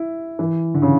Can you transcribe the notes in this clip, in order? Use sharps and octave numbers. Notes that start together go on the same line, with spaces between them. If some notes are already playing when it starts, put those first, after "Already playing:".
Already playing: E4
E3
D3
C#3